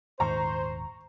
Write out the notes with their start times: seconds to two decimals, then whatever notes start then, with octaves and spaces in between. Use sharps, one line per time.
0.20 D#1 G#2 D#3 C5 A#5 C#6